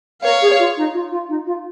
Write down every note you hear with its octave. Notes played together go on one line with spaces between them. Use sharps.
A#4 C#5 F5
G#4
F4
D#4
F4
F4
D#4
F4